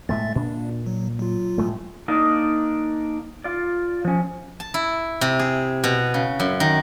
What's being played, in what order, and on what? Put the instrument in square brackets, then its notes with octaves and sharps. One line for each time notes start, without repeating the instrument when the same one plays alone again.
[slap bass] A2 G#3 A3 [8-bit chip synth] E5 A6
[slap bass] A#2 [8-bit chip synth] D4
[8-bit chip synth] F#3
F#3 F4
[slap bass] A2 G#3 A3
[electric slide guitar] A#3 D4 D#4 A#4
F4 D5
F3 C#4
[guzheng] A5
E4
C3
G#4
B2
C#3
F#2
D#3